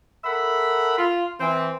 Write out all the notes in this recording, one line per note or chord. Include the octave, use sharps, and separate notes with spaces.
A4 A#4 E5 F#5 B5
F4
E3 C4